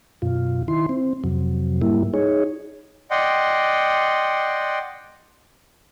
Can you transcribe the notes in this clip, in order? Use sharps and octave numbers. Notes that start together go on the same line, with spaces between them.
F#2 B2 F4
D#3 E4 C6
C4
F2 C3 F#3
G#2 G3 A#3 E4
D#4 G#4 C#5
D5 D#5 F#5 G5 C6